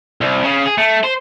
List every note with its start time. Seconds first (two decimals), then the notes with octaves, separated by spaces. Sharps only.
0.21 C2
0.44 C#3
0.65 G#4
0.78 A3
1.04 C5